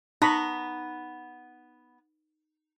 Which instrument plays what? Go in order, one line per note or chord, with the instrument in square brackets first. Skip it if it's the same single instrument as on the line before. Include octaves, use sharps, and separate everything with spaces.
[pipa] B3 [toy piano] D#4 [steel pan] A#5 B5 C#6